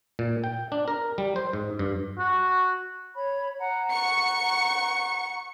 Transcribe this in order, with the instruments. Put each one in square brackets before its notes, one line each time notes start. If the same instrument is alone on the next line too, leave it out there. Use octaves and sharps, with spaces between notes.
[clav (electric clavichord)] A#2
G5
D4
A#4
G3
C5
G#2
G2
[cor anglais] F#4
[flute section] C#5 B5
F#5 A#5
[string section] C#6 C#7